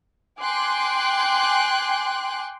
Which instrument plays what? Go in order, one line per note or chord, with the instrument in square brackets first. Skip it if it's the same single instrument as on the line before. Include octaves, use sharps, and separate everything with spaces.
[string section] G5 G#5 C6 D6 F#6